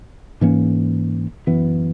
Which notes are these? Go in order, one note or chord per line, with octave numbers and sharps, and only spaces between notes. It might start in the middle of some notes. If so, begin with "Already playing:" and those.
G#2 E3 A#3 C#4
F#2 E3 B3